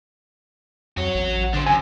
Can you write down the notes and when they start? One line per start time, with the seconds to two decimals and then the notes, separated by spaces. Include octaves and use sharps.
0.97 F2 F#4 C#5
1.15 A1
1.54 D3 D4 C5
1.67 F#2 G#5